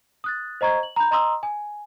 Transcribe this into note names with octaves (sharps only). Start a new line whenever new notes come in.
D#6 F#6 A6
C5 D#5 A#5 C#6 G#6
F#7
A#5 B5 G6
D#5 A#5 C6 D#6 E6
G#5